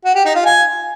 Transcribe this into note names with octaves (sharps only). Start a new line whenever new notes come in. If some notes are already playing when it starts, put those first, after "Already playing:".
F#4
G4
D#4
F4
G#5